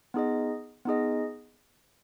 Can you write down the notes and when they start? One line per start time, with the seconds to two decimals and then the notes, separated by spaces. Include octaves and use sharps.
0.14 B3 D#4 G#4 D#5
0.85 B3 D#4 G#4 D#5